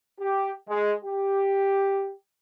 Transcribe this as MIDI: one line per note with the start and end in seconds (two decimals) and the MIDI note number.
0.20 0.52 67
0.69 0.93 56
1.05 2.12 67